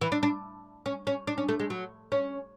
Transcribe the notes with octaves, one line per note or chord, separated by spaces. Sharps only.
E3
D4
D4
C#4
C#4
D4
C#4
A3
G#3
F#3
C#4